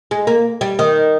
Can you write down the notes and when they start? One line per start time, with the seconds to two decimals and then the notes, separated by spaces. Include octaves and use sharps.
0.11 G#3
0.27 A#3
0.61 G3
0.79 D#3